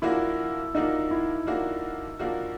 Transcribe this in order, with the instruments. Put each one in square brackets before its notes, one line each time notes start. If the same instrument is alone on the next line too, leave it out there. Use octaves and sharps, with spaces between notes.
[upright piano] F3 A#3 D4 F#4 [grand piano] E4
[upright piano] F3 A#3 D4 F#4 [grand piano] D#4
[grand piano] E4
[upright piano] F3 A#3 D4 F#4
F3 A#3 D4 F#4